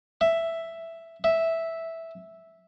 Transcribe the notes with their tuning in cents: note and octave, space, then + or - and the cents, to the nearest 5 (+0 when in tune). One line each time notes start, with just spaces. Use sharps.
E5 +5
E5 -5